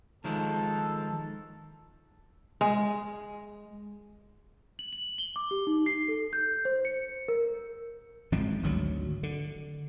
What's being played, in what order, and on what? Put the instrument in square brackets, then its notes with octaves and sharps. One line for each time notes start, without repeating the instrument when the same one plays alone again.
[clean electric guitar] D#3 F3 G#3 [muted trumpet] A4
[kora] G#3
[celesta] F#7
F#7
G7
D6
G4
D#4
C7
A4
G6
C5
C#7
A#4
[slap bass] G#1 F3 G#3 C4
G#1 D2 C#3 F#3
D3